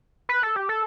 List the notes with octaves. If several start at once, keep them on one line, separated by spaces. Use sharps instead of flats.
B4
A4
G4
A4